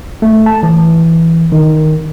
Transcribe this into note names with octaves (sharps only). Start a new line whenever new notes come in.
A3
A5
E3
D#3